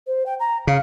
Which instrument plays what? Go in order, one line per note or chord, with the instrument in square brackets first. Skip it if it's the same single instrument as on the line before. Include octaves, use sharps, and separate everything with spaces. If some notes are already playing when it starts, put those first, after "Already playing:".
[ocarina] C5
G5
A#5
[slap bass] C#3 [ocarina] F5